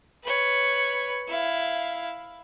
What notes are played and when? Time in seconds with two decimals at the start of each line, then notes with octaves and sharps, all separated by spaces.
0.24 B4 C#5
1.28 E4 F5